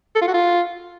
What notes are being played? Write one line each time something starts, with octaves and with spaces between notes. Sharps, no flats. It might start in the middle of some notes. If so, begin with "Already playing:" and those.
A4
F4
F#4
F4